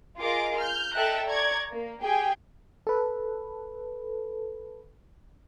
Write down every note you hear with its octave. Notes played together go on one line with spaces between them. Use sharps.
F4 G#4 A#4 D#5 D6
F6 G6
A4 D#5 E5 G5 A#5 F#6
D5 A#5 C#6 G#6
A#3
G4 G#4 G5 G#5
A4 B4